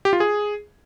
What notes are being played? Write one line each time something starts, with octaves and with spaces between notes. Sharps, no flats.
G4
F4
G#4